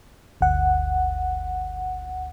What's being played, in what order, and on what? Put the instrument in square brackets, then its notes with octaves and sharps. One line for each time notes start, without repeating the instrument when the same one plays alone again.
[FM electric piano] G1 D2 F#5